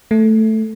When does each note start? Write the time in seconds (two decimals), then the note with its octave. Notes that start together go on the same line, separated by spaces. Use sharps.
0.11 A3